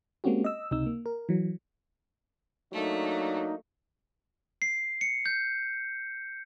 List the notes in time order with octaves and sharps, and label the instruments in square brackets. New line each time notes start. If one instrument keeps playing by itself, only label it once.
[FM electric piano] G#3 A#3 C4 C#4 F#4 G4
D#5 E6
C#2 C3 D#4 E6
A#3
A#4
E3 F#3
[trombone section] F#3 A#3 D4 [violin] A3 [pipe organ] D#4
[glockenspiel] C7
C#7
G6